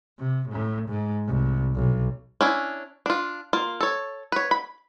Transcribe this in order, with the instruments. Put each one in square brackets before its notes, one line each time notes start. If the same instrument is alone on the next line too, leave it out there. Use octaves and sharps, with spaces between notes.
[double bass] C3
A2
G#2
C2
B1
[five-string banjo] C#4 D4 E4
D4 F4
A#3 F4
A4 C#5
B4 C#5
B5